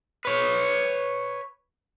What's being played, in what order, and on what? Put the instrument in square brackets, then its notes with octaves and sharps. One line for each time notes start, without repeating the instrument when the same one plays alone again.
[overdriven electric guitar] B4 C#5